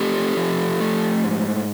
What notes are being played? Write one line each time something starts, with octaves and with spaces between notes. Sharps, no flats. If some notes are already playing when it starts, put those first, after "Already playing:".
Already playing: A3 C4 G4 A4
F3
A3
G#2